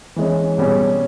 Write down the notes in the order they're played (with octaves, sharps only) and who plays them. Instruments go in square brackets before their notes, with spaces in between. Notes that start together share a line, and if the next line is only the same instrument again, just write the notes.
[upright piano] E3 G#3 C#4
B2 G3 C#4 G#4